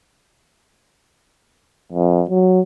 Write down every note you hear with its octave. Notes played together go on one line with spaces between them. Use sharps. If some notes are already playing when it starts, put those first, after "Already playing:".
F2
F#3